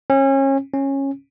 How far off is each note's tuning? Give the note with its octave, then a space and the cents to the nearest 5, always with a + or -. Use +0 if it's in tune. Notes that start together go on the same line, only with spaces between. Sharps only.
C#4 -30
C#4 -15